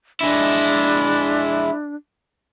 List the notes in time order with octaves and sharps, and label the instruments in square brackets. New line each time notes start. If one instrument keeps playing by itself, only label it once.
[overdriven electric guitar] G#3 E4 [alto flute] D4